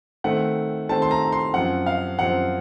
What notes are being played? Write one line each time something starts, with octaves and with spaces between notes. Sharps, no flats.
D#3 A3 C4 F#5
D#3 A3 C4 A5
C6
A#5
C6
F#2 F3 C4 F#5
F5
F#2 F3 C4 F#5